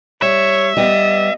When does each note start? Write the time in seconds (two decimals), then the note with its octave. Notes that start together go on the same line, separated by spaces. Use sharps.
0.22 G3 C#5 E5
0.77 G3 B3 G4 D#5